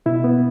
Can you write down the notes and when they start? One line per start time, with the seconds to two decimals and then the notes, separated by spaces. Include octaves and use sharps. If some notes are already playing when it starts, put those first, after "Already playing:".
0.06 B2 E4
0.24 B3